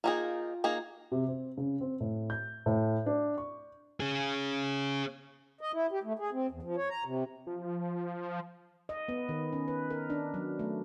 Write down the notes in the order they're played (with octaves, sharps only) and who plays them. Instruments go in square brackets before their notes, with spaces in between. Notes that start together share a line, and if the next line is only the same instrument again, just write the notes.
[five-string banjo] A#3 D#4 G#4 [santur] F4 G5
[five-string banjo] A#3 D#4 G#4
[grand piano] C3
C4
C#3
C4
A2
G6
A2
D4
C#6
[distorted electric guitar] C#4 G#4
[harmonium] D#5
E4
G4
A3
G#4
C4
E2
F3
C#5
A#5
C3
[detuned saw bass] F3
[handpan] D#5
B3
D#3
C#4
B4
A#4
D4
F#3
A3